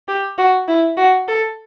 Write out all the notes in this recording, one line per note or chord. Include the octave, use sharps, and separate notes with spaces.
G4
F#4
E4
F#4
A4